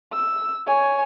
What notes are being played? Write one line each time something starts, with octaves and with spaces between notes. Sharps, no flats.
E6
C#5 G#5